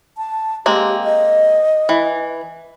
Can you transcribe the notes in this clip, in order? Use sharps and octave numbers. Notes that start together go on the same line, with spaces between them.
A5
G#3 A#3 C4 G4
D#5
E3